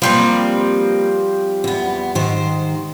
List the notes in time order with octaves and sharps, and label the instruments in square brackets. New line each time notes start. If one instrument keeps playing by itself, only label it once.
[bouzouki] F3 G3 C4 [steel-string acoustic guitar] A#3 B4
[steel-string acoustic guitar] E2 B3
G#2 D#3 C5